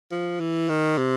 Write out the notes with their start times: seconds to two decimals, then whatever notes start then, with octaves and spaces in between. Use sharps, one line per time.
0.11 F3
0.40 E3
0.69 D#3
0.97 C3